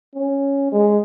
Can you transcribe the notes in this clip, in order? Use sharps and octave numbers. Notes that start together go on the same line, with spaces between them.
C#4
G#3